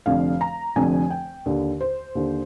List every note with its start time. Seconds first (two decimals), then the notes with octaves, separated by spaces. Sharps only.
0.06 F1 F2 D3 F5
0.41 A#5
0.76 F1 F2 D3 G#5
1.10 G5
1.46 D#2 D3
1.81 C5
2.15 D#2 D3